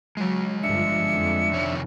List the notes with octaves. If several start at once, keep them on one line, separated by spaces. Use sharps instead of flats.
F#3 G#3 C#5
G1 F3 D4 E5 C#7
F2
C3 D#3 C#5